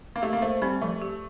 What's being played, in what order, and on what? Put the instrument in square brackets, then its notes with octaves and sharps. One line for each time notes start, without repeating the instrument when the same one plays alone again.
[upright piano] A#3
[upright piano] A3 [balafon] G4
[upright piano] A#3
[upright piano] A3 [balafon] C5
[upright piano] G3 [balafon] C4
[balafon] F3 [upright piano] A3
[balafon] G4